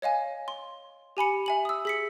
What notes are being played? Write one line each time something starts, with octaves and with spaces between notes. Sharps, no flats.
C#5 D#5 F5 G#5
C6
G4 G#5 B5 C#7
E5 G#5 F#7
D#6 E6
G#4 B6 C#7